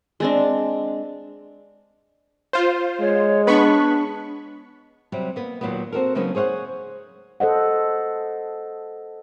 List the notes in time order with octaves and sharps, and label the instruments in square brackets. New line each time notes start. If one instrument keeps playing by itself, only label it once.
[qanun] G#3 C4 D4
[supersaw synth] F4 C5
[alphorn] G#3 [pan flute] C#5
[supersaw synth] B3 B5 C#6 [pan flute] D4
[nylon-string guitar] C3 F#3 G3
A#3 B3
D#2 A#2 F#3 A#3 B3
C4 F#4 A4 A#4
C#3 F#3 A#3 B3 C#4 D#4
G#4 C5 C#5 F5 F#5
[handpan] A4 C5 D#5 F#5